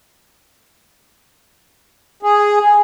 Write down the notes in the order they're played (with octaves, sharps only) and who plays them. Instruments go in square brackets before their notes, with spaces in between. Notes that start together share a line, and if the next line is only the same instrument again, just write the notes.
[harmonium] G#4